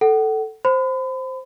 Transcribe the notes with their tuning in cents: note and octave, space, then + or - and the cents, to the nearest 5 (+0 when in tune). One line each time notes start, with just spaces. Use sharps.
A4 +0 F#5 +35
C5 +0 B5 +35